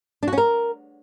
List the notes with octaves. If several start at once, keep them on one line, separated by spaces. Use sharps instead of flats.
D4
F#4
C#4
A#4